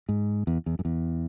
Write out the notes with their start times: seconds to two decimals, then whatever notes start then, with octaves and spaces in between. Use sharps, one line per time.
0.09 G#2
0.47 E2
0.66 E2
0.79 F#2
0.85 E2